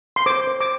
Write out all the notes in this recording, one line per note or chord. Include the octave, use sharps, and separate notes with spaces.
C6
C5 D6
C5
D6